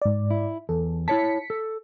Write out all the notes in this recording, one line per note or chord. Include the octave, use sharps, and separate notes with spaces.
G#2 D5
E4
E2 A4
E4 C#5 A5 B6 C#7
A4